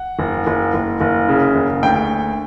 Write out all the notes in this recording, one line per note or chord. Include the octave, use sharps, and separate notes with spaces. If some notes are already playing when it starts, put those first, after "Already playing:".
Already playing: F#5
F#1
F#1
F#1
F#1
C#3
F#1
D2 G5